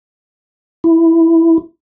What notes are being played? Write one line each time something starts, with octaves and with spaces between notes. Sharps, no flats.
E4